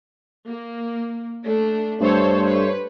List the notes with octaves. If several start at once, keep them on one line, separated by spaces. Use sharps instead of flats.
A#3
A3 D4
G2 A3 A4 C5 C#5
B4